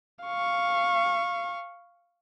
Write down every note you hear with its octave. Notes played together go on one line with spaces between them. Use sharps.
F5 C#6